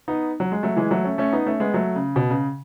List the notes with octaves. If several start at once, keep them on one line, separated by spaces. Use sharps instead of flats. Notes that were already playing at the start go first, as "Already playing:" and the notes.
B3 D#4
F#3
G#3
F#3 A3
E3 G#3
F#3 A3
A3 C#4
A3 C#4
B3 D#4
A3 C#4
G#3 B3
F#3 A3
C#3
B2
C#3